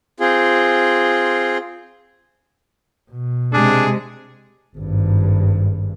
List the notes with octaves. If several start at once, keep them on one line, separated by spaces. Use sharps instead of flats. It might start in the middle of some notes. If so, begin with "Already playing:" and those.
C4 F4 G#4
B2
C3 G#3 D4 G#4
G#1 G2